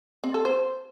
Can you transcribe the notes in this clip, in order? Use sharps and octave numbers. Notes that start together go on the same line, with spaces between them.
C4
A4
C5